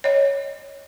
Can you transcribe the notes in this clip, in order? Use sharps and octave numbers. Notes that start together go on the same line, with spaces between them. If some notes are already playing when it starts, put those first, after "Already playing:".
C#5 D#5